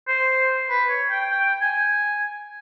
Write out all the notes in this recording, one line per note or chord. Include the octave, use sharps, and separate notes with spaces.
C5
B4
C#5
G5
G5
G#5